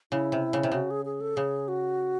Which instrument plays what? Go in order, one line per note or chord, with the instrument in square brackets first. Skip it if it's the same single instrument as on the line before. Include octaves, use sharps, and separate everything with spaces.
[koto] C#3 [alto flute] E4
[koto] C3
C#3
C3
[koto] C#3 [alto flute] F#4
[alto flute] G#4
G#4
A4
[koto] C#3 [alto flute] G#4
[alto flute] F#4